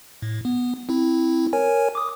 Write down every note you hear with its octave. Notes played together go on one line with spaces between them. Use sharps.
A2
B3
C4 E4
A#4 C#5 G#5
D6 D#6